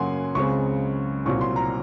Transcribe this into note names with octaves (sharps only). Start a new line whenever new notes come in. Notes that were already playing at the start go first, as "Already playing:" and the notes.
Already playing: F#2 C#3 F#3 A#3 F#5 G#5 C6
C#2 C#3 G#3 C4 C#6
C2 A#2 F#3 C4 C#6
C6
A#5